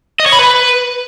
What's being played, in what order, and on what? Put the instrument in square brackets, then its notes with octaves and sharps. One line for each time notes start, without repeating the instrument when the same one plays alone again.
[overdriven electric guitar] D#5
C#5
B5
B4